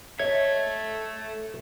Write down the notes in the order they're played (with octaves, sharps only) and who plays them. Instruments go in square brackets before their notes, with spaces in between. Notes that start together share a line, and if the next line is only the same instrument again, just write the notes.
[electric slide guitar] A4 E5 [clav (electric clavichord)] C#5 D#5 [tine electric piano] G#6